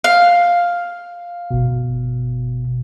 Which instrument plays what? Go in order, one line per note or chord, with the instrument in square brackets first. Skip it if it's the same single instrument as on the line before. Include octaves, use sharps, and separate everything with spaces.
[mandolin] F5
[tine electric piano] G1 B2